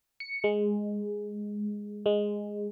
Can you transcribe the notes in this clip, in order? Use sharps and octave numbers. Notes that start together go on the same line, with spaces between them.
C#7
G#3
G#3